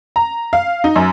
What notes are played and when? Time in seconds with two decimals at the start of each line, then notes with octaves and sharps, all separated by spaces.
0.16 A#5
0.53 F5
0.84 D#4
0.96 F#2